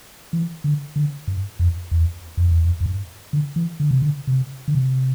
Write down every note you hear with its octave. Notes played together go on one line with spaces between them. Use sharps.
E3
D3
D3
G2
F2
E2
F2
E2
F2
F2
G2
D3
E3
D3
C3
D3
C3
D3
C3